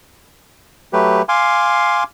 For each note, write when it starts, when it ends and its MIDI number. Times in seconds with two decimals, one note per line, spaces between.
0.93 1.22 54
0.93 1.22 57
0.93 1.22 67
0.93 1.22 71
1.29 2.04 77
1.29 2.04 80
1.29 2.04 84
1.29 2.04 86